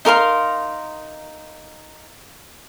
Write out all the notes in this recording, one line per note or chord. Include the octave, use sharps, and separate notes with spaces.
D#4 A#4 F5 C6